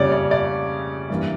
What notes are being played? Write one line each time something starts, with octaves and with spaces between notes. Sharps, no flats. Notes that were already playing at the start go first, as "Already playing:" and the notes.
Already playing: F2 C#3 G3 A#3 C#4 C#5 D5
D5
D5
G2 E3 A#3